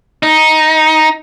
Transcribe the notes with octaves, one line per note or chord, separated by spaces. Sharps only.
D#4